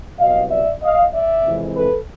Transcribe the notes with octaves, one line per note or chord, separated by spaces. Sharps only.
C2 B2 F#3 D#5 F5
D5 E5
D#5 F5
D5 E5
F2 C3 E3 G#3 C4
A4 B4